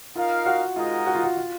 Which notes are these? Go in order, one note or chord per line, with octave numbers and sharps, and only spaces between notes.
D#4 F4 A#4 F5
F#4
G#3 D#4 F4 A#4 D#5 F#5
F#4
F4
F#4
F4